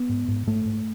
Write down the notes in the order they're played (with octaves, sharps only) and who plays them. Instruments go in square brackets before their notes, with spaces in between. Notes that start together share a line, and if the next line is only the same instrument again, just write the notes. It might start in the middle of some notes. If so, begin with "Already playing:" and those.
Already playing: [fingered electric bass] B3
G#2
G#2
G#2 A3
G#2